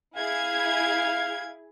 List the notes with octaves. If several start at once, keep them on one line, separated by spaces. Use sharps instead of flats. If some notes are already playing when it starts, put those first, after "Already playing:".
E4 G#4 F5 G#6